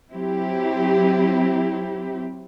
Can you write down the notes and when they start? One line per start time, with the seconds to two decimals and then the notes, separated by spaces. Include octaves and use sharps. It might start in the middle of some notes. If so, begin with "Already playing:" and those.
0.11 F#3 C4 E4 G4